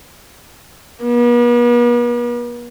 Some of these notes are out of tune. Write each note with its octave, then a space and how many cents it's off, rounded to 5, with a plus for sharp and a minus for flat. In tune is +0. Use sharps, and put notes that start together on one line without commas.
B3 -45